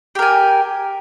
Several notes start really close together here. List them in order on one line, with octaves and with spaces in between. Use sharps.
G4 A#4 G#5